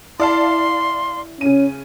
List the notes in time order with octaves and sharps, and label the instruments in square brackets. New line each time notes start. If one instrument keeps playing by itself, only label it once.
[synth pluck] E4 [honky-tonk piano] D5 F5 A5 [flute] C6
[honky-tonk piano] C#3 D#7 [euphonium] C#4